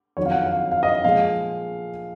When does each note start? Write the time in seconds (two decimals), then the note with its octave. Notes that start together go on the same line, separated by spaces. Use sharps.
0.17 F2 D#3 F#3 C#5
0.26 F5
0.31 F#5
0.46 F5
0.71 F5
0.83 D#5
1.04 A#2 F3 G#3 F5